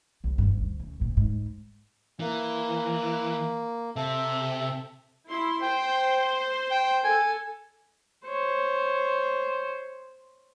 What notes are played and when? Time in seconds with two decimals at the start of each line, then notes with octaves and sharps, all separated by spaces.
0.24 C2
0.38 F#1 G2
0.61 D2
0.79 C#3
1.00 F#1 A#2
1.17 G#2
2.20 E3 A#3
3.96 C3 A4 E5
5.28 E4 C6
5.62 C5 G5
6.71 G5
7.04 A4 G#5
8.26 C5 C#5